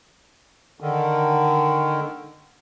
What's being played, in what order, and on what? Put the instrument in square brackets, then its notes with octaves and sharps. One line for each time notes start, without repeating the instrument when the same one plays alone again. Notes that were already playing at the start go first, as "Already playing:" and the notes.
[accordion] D3 D#3